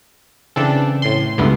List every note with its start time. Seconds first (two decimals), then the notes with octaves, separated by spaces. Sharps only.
0.56 C#3 E3 C4 D4 A4
1.02 A2 C6
1.38 C#2 G2 D3 B3 E4